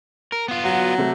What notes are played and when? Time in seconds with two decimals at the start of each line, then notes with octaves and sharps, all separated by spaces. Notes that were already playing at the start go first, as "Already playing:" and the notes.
0.32 A#4
0.48 B3 F4
0.64 F#3 F#4
0.98 C3 A3